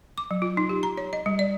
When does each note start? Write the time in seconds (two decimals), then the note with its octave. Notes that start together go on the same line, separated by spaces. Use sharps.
0.18 D6
0.31 F#3
0.42 F4
0.57 D#4
0.69 G4
0.83 A#5
0.98 C#5
1.13 D#5
1.26 G3
1.39 D5